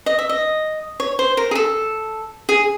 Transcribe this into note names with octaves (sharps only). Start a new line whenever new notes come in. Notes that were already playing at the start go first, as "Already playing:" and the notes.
D#5
E5
D#5
C#5
C5
A#4
G#4
A4
G#4